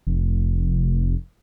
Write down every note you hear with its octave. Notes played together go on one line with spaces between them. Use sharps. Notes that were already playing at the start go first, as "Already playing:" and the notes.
F1